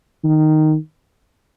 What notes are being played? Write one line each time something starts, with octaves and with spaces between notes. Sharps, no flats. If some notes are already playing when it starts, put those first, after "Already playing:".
D#3